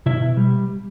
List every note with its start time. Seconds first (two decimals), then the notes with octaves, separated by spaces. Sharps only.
0.06 B2 E4 E5
0.22 B2
0.37 G3